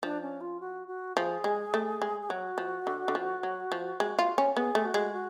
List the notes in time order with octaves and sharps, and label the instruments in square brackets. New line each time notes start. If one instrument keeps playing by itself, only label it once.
[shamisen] F3 [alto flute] D4
[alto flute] C#4
F4
F#4
F#4
[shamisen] F3 [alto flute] G#4
[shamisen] G#3
A3
G#3
[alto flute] G#4
[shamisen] F#3 [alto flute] F#4
[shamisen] F3
D3
D3
F3
F#3
F3
G#3
F4
C#4
[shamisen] B3 [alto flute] G#4
[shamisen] A3
[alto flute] F#4
[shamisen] G#3
[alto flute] F#4